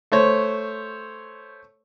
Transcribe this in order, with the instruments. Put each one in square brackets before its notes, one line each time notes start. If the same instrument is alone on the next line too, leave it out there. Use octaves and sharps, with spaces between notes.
[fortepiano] A3 C5 C#5